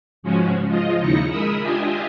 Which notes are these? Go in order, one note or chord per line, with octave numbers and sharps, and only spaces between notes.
G#2 C#3 F3 G#3 C#4 F#4
F3 G#3 F4 D#5
D#2 C#3 D#4 E4 A#6 C#7
G#3 A#4 B5 D#6 E6
D4 F4 G4 D#5 E5 G#5